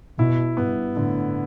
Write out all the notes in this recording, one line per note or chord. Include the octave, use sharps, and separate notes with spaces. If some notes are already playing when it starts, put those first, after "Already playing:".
B2 E4
G2 B3
A2 D3